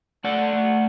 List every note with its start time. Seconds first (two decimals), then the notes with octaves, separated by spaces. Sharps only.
0.24 A3 D5 F#5
0.53 A3